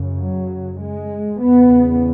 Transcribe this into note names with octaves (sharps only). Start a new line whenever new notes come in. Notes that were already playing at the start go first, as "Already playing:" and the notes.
Already playing: F#2 C#3
F#3
G#3
E2 C#3 B3